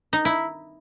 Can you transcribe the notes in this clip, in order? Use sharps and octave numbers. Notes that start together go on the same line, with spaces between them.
D#4
E4